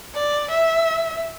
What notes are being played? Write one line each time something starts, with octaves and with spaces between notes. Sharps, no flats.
D5
E5